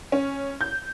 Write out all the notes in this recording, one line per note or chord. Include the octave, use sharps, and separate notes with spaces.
C#4
G6